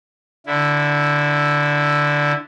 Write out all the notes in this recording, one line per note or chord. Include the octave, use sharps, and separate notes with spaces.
D3 E4